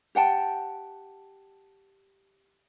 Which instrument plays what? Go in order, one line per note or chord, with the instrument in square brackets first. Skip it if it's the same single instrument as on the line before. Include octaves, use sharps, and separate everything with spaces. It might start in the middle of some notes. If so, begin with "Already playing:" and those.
[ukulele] G4 F#5 G5 A5